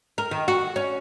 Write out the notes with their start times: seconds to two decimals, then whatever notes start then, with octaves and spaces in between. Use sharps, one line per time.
0.18 A#4
0.31 D#3
0.48 F#4
0.76 C#4